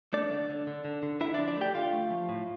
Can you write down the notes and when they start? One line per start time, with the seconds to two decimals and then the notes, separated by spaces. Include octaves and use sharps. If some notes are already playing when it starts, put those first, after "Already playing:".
0.13 A3 D4 D5
0.31 D3
0.50 D3
0.67 D3
0.85 D3
1.03 D3
1.21 D3 E4 E5
1.34 D4 D5
1.39 F3
1.48 D4 D5
1.57 A3 G4 G5
1.75 D3 F4 F5
1.93 A3
2.10 F3
2.29 A2